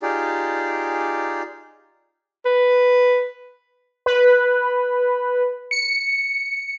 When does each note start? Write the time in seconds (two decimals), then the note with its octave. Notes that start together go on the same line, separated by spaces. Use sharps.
0.02 D#4 F4 G4 G#4 D5
2.46 B4
4.06 B4
5.71 C#7